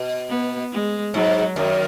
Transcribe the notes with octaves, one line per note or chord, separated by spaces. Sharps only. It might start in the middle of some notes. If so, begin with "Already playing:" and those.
Already playing: B2
B3
G#3
G#2 F#3
F#2 D#3